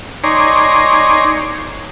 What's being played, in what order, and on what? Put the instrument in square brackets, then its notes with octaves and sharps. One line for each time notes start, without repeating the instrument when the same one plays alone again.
[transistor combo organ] D#4 C#5 D5 G#5 A#5 C6